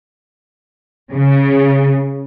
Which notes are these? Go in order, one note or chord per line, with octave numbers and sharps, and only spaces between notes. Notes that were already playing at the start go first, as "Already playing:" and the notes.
C#3